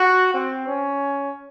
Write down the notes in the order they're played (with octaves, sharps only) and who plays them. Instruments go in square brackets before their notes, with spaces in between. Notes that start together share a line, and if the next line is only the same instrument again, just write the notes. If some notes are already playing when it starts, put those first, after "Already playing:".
Already playing: [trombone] F#4
C4
C#4